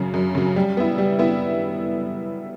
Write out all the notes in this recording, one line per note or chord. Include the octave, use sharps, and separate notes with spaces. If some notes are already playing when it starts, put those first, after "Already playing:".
Already playing: F#2 C#3 F#3
F#2
C#3 F#3
G3
B3 E4
G3
B3 E4